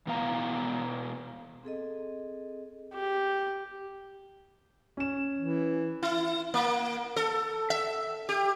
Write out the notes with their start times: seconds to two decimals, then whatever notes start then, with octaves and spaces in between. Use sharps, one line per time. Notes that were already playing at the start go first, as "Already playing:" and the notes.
0.07 B2 E3 B3 F5 A#5
1.63 C4 G#4 A4 D#5
2.94 G4
4.97 C#4 E7
5.38 E3
6.03 E4
6.54 A#3
7.16 A4
7.70 E5
8.29 G4